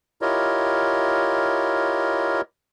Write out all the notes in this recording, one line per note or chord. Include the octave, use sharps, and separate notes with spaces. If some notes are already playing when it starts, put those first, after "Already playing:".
E4 F4 G4 A#4 C#5 D#5